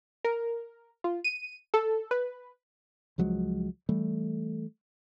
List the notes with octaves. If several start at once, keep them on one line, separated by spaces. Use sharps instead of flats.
A#4
F4
D#7
A4
B4
C#2 F3 F#3 G#3
E3 G3 A3